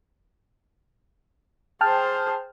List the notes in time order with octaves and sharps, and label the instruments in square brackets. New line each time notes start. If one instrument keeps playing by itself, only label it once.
[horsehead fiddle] G#4 C5 [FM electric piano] G5 A5 F6